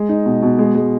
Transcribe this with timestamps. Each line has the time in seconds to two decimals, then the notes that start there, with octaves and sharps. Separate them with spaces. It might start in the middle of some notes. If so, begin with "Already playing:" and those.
Already playing: G#3
0.09 D#4
0.26 B2
0.42 B2
0.59 G#3
0.75 G#3